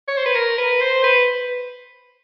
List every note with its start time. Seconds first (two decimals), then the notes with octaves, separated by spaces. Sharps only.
0.08 C#5
0.17 C5
0.26 B4
0.35 A#4
0.58 B4
0.81 C5
1.04 B4